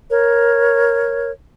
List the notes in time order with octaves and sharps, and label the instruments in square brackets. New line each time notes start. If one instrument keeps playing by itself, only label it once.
[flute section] A#4 C#5